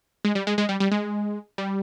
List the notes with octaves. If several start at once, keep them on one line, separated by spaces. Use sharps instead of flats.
G#3
G3
G#3
G#3
G3
G3
G#3
G3